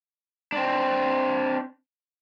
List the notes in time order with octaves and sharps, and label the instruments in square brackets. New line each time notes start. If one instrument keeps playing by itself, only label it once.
[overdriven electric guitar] C4 D4